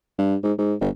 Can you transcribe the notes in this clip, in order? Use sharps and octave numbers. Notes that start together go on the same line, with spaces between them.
G2
G#2
G#2
G1